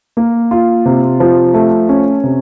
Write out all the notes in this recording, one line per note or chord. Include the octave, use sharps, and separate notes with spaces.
A#3
F4
C3
F3
A3
C#4
C3